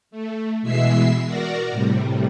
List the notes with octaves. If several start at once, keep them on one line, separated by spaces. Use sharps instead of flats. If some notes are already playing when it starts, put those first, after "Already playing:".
A3
B2 E3 G#3 E5 E6 C7
F#4 A#4 D5 A#5
A2 C3 G3